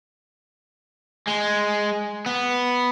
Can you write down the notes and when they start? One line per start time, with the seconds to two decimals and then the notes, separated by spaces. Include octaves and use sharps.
1.27 G#3
2.26 B3